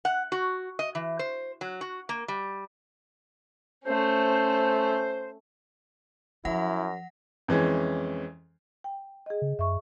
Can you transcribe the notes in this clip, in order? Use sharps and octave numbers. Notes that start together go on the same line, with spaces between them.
F#5
F#4
D#5
E3
C5
F#3
F#4
A#3
G3
A3 C#4 C5
F#2 F3 E4 F#5 A#6
F2 E3 G#3 C#4
G5
G#4 D#5
C#3
F#2 E5 C#6